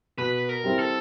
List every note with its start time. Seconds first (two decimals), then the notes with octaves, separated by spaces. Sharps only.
0.18 B2 B4
0.49 A#4
0.64 G3 C4 E4
0.79 A4